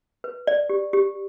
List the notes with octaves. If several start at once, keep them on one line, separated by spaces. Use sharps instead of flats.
B4
D5
G4
G4